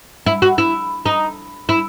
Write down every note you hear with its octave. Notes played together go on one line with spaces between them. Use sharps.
E4
F#4
E4
D#4
E4